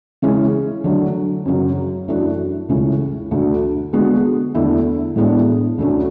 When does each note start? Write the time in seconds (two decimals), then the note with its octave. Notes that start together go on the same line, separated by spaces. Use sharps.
0.22 C#3 E3 G#3 C#4
0.84 D3 F#3 A3
1.45 F#2 C#3 F#3
2.08 F#2 E3 A3 D4 F#4
2.69 C#2 C#3 E3 A3 C#4
3.31 D2 D3 A3
3.93 D3 G#3 B3 F#4
4.55 E2 D3 A3 E4
5.16 A2 E3 G#3 B3 D4
5.78 D2 D3 A3 C#4